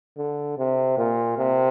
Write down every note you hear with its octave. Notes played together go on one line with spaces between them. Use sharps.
D3
C3
A#2
C3